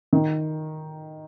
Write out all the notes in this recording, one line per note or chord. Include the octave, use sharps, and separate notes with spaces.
D#3